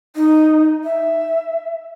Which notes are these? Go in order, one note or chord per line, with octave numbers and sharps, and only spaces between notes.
D#4
E5